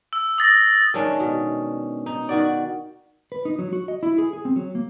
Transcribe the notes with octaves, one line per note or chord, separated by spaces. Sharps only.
E6
D#6 A6 A#6
D#3 G#3 C#4 D4
B2
D#4
D#3 F#4 D5
B4
D#4
F#3
F#4
D#5
E4
G#4
G#4
C4
F#3
A#3